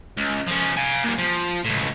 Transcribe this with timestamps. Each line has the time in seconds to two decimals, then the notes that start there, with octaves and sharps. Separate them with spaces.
0.17 C#2
0.47 F3 C#4
0.77 F5 G#5
1.04 A#2 G3
1.18 F3
1.65 C#2 A2